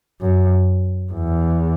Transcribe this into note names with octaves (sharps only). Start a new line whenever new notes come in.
F#2
E2